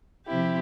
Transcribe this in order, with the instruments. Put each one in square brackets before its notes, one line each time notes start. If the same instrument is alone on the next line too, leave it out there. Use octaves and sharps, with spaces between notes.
[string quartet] C3 F3 C4 E4 G4